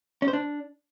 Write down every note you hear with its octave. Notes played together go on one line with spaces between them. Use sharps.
C#4
C5
D4